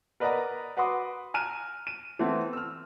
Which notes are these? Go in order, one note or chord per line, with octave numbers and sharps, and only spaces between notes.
A#4 B4 D5 D#5 F#5 A#5
F#4 B4 B5 C6 D6 D#6
G#5 A#5 F6 F#6 D#7
D#7
E3 A3 B3 C4
E6 F6